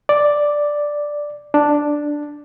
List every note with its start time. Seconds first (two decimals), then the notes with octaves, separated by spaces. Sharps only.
0.09 D5
1.54 D4